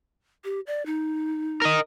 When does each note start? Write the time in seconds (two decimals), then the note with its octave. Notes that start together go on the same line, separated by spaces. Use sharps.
0.44 G4
0.67 D5
0.86 D#4
1.62 A#4 D#5